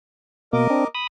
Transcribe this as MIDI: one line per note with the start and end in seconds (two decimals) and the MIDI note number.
0.53 0.68 47
0.53 0.68 58
0.53 0.87 70
0.53 0.87 75
0.53 0.87 86
0.70 0.85 60
0.70 0.85 62
0.95 1.07 83
0.95 1.07 87